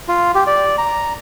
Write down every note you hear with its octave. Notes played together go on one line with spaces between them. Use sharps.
F4
G4
D5
A#5